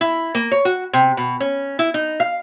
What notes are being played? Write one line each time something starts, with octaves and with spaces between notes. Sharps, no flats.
E4
A#3
C#5
F#4
C3
B2
C#4
E4
D#4
F5